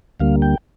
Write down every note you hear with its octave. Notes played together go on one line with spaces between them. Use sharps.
D2 D3 G3 A#3 F5
G5